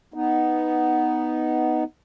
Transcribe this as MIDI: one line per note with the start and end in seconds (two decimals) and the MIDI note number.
0.14 1.84 59
0.14 1.84 63